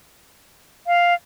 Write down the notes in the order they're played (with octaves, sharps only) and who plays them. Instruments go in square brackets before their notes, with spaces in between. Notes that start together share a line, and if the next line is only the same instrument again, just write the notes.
[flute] F5